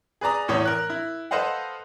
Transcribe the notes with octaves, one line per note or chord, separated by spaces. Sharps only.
G#4 B4 D5 A#5 D#6
E2 A2 E3 C#5 D#6
A#4 F#6
E4
A4 B4 C5 D#5 F5 F#5